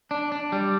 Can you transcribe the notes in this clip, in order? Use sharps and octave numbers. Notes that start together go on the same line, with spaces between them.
D4
D4
G3